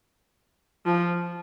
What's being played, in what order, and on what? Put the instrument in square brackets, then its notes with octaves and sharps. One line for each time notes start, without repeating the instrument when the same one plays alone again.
[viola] F3